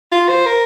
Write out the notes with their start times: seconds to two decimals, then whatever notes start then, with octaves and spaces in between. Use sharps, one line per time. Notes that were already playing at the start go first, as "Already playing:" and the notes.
0.12 F4
0.29 C5
0.46 A#4